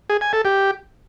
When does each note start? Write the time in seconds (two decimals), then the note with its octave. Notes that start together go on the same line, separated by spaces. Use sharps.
0.10 G#4
0.21 G#5
0.33 A4
0.45 G4